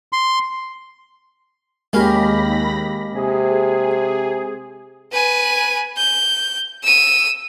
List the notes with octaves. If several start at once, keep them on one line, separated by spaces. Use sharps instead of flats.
C6
D#2 G#3 A#3 C#4 G4 F5 B5 A#6
C3 G#4
B4 G#5
G6
E6 D#7